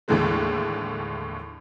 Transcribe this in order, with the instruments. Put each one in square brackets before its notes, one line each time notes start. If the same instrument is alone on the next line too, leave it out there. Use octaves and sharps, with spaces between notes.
[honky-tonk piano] D#2 A2 D3 E3 G#3 A3